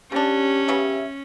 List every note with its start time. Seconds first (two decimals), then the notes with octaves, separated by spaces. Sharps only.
0.12 C#3 C#4 D4 G4
0.68 C#3 B3 E5